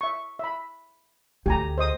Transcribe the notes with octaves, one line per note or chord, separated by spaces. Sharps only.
E5 C#6
E5 B5
D2 G4 G#5 A#5
C5 D#5 D#6